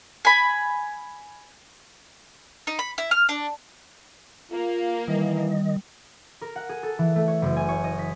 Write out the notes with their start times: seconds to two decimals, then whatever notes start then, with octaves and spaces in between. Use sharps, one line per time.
0.25 G#5 B5
2.67 D#4
2.79 B5
2.98 E4
3.11 F6
3.29 D4
4.52 A#3 F4
5.08 D#3 E3 G3 D#5
6.41 A#4
6.56 F#5
6.69 G#4
6.83 A4
6.98 E3
7.16 A3
7.28 C#5
7.42 F#1
7.56 G#5
7.69 C#5
7.84 D#5
7.99 B6